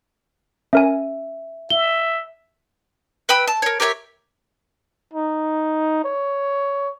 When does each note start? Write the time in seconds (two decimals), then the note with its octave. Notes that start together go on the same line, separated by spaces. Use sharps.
0.73 C#4 A#4 E5 G#5
1.70 E5 G7
3.29 B4 G5 B5 E6
3.47 A5
3.62 A#4 C#5
3.80 G4 A#4 C#5 E5
5.14 D#4
6.04 C#5